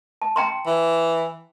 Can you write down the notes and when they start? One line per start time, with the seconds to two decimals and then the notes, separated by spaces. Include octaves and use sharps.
0.22 A5
0.36 G5 A#5 C6
0.67 E3